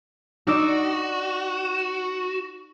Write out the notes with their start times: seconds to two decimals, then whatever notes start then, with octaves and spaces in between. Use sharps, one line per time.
0.47 D#4 F#4 D5 E6